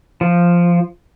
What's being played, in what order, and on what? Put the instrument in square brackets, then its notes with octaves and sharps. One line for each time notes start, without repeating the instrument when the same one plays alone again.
[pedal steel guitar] F3